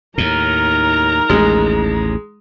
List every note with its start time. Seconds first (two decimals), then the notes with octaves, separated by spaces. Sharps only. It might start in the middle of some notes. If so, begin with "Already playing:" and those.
0.18 D#2 A2 D#4 A#4 A#5
1.30 A1 D#2 G#3